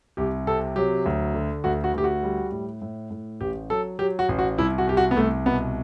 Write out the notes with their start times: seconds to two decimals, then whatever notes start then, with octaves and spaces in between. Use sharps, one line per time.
0.17 C2 G4
0.47 C3 A4
0.76 F#3 G4
1.06 D2
1.34 D3
1.64 D2 F#4
1.84 F#4
1.94 D2 G4
2.04 F#4
2.23 G3
2.52 A2
2.82 A2
3.11 A2
3.41 A1 G4
3.70 F#3 A4
3.99 F#3 G4
4.19 F#4
4.29 A1
4.39 F#4
4.58 C2 E4
4.78 F#4
4.87 C2 G4
4.97 F#4
5.11 B3
5.16 C2 A3
5.46 B2 B3